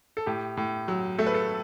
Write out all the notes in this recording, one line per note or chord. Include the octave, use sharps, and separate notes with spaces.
A4
A2 G4
A2
F#3
A3 A4
B4
A4